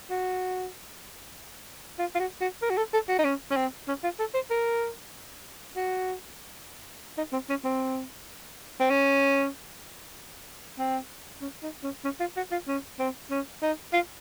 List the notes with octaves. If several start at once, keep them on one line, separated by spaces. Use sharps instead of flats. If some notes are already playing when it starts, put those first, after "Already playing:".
F#4
F4
F4
F#4
F#4
A#4
F#4
A4
A4
F#4
D#4
C#4
C#4
C4
C#4
F4
A4
C5
A#4
F#4
D#4
C4
C#4
C4
C4
C#4
C4
C#4
D#4
C#4
C#4
F4
F#4
F4
C#4
C4
C#4
D#4
F4